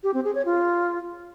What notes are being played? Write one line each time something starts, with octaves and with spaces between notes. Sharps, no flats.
G4
C4
G#4
C#5
F4